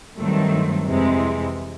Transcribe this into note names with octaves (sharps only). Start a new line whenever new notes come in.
G2 D#3 F#3 A3 C4
F2 C3 E3 G#3 C4